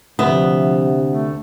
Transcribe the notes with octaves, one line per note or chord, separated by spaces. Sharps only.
D2 C3 F3 B3 E5
A3